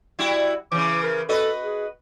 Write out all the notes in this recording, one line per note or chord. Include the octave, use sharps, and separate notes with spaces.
G3 E4 F#4
C#3 E3 D6
A#4
F#4 A4 B4 D#5
G#4